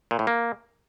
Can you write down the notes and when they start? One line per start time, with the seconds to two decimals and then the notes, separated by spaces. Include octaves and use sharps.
0.11 A#2
0.19 A2
0.27 A#3